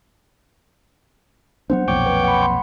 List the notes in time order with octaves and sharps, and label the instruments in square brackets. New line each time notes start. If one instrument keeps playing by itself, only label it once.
[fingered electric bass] F#3 B3 D4 [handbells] C5 F#5
[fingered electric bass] B1 F2 A#2 [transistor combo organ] C#5 G5 D6
[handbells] B4 F#5
F#5 B5
C6